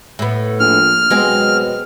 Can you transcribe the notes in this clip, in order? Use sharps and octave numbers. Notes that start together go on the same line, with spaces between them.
A2 B3
A#1 F6
B2 F#3 G#3 C4